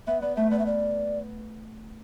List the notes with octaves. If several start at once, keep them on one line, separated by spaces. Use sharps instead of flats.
B3 E5
B3 D5
A3 E5
B3 D5
E5
D5